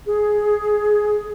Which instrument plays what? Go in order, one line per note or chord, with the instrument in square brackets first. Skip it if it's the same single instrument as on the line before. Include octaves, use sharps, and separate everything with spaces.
[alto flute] G#4